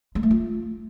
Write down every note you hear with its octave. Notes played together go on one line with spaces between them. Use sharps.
G#3
A3
F4